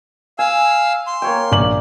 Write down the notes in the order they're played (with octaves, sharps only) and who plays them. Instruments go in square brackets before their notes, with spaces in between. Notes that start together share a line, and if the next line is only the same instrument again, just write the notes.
[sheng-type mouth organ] F5 E6 [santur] G#5
[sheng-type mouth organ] C6
[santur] A#3 C#5 G5
[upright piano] A#1 F#7 [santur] D5